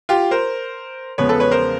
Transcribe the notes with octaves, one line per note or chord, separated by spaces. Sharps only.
F4 G4
A#4 C5
E2 C#3 F3 G#3 B3 B4 C#5
A4 B4
B4 C#5
A#4 C5